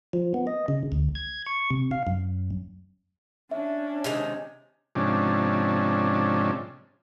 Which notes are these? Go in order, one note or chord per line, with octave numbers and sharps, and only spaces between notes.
F3
B3
D#5
C#3
D2
G#6
C#6
C3
F5
F#2
C#4 D4 E5
C3 D#3 G#3
G#2 C3 F3 C#4 D4